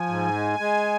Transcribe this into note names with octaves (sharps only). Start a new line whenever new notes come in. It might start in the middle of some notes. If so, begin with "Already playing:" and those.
Already playing: F3 G#5
G#2
G#3
G#3